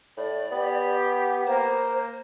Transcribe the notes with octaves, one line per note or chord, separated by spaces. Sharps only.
A2 D5
B3 G4
A#3 C5